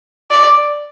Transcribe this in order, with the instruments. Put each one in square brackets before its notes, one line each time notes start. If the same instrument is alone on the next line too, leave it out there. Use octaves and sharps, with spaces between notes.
[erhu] D5